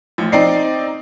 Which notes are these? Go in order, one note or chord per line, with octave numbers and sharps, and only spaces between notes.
A1 F3
C4 D#4 D5 C7